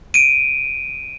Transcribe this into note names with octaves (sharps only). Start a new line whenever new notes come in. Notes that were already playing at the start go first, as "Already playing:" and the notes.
D7 D#7